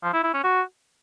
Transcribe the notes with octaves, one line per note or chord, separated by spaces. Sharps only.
F3
E4
E4
C#4
F#4